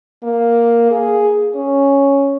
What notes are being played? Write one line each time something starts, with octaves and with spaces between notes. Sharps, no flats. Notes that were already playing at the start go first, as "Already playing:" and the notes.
A#3
G#4
C#4